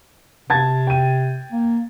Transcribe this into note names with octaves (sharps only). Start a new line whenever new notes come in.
C3 A5 G#6 A6
G5 D#7
A#3